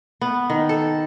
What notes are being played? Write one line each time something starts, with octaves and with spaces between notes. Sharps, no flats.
B3
D#3
A4